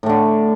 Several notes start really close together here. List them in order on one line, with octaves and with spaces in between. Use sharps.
A2 A3 D3